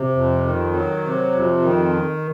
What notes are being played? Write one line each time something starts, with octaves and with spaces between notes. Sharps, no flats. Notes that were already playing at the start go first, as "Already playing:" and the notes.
Already playing: C3
F2
D#3
F#3
C3
F2
D#3